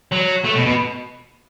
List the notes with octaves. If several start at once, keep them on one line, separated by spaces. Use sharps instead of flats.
F#3
A3
B2
B2